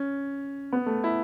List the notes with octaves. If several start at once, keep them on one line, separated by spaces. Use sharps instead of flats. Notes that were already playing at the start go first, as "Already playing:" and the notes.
Already playing: C#4
B3
A3
E4